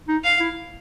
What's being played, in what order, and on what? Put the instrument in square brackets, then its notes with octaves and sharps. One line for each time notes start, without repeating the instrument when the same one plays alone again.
[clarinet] D#4
[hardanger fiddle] F5
[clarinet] E4